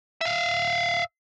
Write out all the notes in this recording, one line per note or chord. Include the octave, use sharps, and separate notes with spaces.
E5 F5